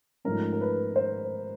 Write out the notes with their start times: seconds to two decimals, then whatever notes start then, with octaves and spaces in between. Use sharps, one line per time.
0.25 G#2 F3 A3 C#4 A#4
0.53 A#4
0.61 B4
0.96 C5